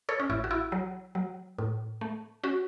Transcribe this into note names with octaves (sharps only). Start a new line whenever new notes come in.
A4 C#5
C#4
A1 E4
F#4
E4
F#3
F#3
A2
A3
C#4 F#4